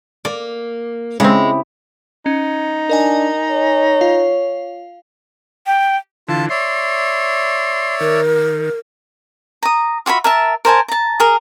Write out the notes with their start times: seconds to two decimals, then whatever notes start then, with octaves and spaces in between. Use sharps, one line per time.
0.25 A#3 D5
1.20 C#3 G#3 C4 E4 G4
2.26 C#4 D#4
2.89 D4 A#4 D#5 G#5
3.51 C#5
4.01 F4 F5
5.67 G5
6.29 D3 E3 F4 A5
6.50 C#5 D5 E5 C6
8.00 D#3 A#4
9.63 A#5 D#6
10.06 F4 F#4 E5 B5
10.24 A#4 E5 A5
10.65 A#4 C5 G#5 A5
10.88 A5 A#5
11.20 G#4 A#4